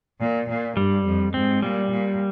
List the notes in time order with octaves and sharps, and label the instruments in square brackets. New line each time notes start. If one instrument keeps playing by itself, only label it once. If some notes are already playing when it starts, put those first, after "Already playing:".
[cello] A#2
A#2
[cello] G2 [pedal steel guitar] G3
[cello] F2
[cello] G#2 [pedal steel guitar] C4
[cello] A#2 [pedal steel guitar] G3
[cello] A#2